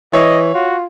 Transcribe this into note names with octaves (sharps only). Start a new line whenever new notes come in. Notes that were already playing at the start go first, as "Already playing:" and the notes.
E3 C#5 D#5
F4 F#4